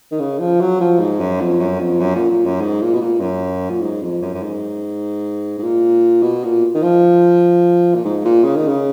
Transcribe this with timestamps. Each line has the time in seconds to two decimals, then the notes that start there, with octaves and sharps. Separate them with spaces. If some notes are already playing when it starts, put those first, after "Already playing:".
0.11 D#3
0.20 C#3
0.39 F3
0.60 F#3
0.80 F3
1.00 G#2
1.20 F#2
1.41 F2
1.60 F#2
1.80 F2
2.01 F#2
2.15 A#2
2.31 A#2
2.45 F#2
2.61 G#2
2.82 A#2
2.94 B2
3.01 A#2
3.21 F#2
3.70 A#2
3.81 G#2
4.02 F2
4.22 F#2
4.34 F#2
4.43 G#2
5.58 G#2
5.63 A#2
6.22 B2
6.44 A#2
6.75 D#3
6.83 F3
7.95 A#2
8.04 G#2
8.25 A#2
8.44 C#3
8.55 D#3
8.68 C#3